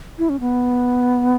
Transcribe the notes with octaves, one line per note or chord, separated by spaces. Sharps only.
E4
C#4
B3